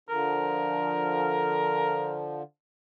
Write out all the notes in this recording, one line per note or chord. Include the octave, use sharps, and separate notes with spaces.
D3 F3 A#4